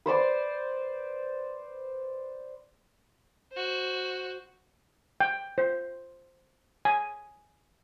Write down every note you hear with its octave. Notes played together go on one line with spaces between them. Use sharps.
B4 C5 D5 C6
F#4 C5
G5
C5
G#5